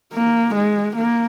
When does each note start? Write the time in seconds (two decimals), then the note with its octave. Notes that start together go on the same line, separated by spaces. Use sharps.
0.14 A#3
0.55 G#3
0.96 A#3